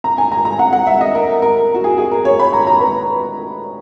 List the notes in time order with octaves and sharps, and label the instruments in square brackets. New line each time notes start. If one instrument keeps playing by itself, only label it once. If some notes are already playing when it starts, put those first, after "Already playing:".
[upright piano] A#5
G#5
A#5
A#5
F#5
F#5
E5
D#5
A#4
A#4
F#4
G#4
G#4
A#4
C#5
B5
A#5
A#5
B4